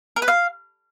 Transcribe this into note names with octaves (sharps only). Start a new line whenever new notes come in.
A#4
B4
F5